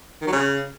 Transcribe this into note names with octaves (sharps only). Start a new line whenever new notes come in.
D#3
F#3
C#3